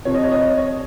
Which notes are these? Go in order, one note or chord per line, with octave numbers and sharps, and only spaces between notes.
C3 F3 C#5
D#5
C#5
D#5
C#5
D#5
C#5